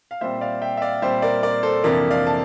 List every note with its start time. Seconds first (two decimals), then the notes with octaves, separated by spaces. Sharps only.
0.11 F5
0.21 A#2 G3 C4 C5 E5
0.41 D5 F5
0.62 E5 G5
0.77 E5
0.82 D5 F5
1.02 A#2 G3 C4 C5 E5
1.22 A#4 D5
1.43 A#4 D5
1.63 A4 C5
1.84 F2 C3 E3 A#3 D4 A#4 D5
2.11 D5 F5
2.27 A5